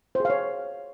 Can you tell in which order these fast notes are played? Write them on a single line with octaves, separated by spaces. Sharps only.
C5 G#4 F5 C#5